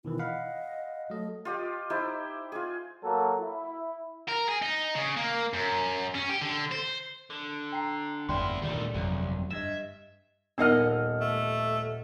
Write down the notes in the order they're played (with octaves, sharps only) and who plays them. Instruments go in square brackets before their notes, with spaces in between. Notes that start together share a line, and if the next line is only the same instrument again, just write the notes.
[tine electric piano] B2 D#3 E3 [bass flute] E4
[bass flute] D#5 [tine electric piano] F5 F#5 B5
[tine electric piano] F#3 D#5 [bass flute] A3
[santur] F4 G4 D#5
D#4 E4 G4 C5
F4 G#4
[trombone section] F#3 A#3 A4
E4
[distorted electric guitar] A#4
G#4
D#4
C#3
A#3
F#2
C#4
G4
D3
C5
[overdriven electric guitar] D3
[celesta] G5 A#5 C7
[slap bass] G1 F2 A2 [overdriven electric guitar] B3 E4 [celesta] D5 G5 C6
[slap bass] D2 A#2 D#3 [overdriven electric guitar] G3 A3 [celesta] D5
[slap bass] G1 F2 F#3 [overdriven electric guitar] C2
[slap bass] G2 [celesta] D#5 G#6 E7 [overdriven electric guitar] E5
[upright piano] D#1 F6 [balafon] B3 D#4 A#4 [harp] D#5 F#5 E6
[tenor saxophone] A3